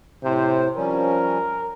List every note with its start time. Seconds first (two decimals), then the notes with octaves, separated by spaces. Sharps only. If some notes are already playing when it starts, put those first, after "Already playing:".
0.24 A2 C3 C5
0.76 F3 G3 C#4 A#4